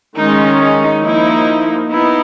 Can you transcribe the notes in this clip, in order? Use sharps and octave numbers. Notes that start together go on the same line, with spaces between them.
D#3 G#3 C#4 D#4
D#4
F3 A#3 D#4 E4
B3 D#4 E4